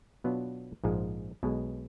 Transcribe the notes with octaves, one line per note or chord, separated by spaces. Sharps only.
B2 F#3 B3 D4 F4
A#1 G#2 F3 G#3
B1 B2 G#3